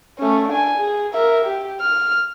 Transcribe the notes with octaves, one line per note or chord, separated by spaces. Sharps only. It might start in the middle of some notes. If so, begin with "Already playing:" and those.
A3 C#4
D4 G#5
G#4
A#4 E5
G4
F6